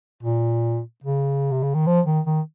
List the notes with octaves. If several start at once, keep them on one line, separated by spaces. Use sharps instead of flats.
A#2
C#3
C3
C#3
D#3
F3
D#3
D#3